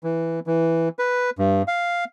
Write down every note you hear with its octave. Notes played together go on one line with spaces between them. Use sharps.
E3
E3
B4
G2
F5